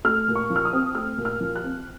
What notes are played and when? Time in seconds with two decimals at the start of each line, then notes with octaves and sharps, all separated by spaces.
0.05 A3 F6
0.28 A#2
0.35 C#6
0.50 F3
0.56 F6
0.65 D#6
0.73 C4
0.95 A3 F6
1.18 A#2
1.25 F6
1.40 F3
1.56 F#6
1.64 C4